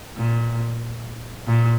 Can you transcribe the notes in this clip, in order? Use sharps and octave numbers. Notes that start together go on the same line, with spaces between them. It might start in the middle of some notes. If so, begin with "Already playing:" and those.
A#2
A#2